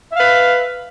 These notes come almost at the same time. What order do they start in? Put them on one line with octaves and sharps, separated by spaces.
E5 F5 B4